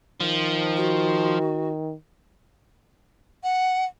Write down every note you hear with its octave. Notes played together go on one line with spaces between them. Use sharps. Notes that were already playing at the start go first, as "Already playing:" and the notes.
D#3 F3
F#4
F#5